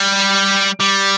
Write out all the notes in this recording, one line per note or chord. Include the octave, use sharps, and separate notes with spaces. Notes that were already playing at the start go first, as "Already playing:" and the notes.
Already playing: G3
G3